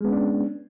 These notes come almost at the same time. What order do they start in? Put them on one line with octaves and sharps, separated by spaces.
G#3 B3 C#4 D4